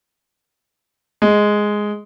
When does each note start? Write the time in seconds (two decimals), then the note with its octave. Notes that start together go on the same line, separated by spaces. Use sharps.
1.22 G#3